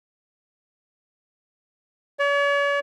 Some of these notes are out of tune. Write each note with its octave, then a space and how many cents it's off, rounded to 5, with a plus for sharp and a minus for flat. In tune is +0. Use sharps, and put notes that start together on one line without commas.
C#5 +45